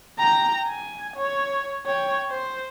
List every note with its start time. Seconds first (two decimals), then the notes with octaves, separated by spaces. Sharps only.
0.18 G5 A#5
0.67 G#5
1.16 C#5
1.86 C#5 G5
2.30 C5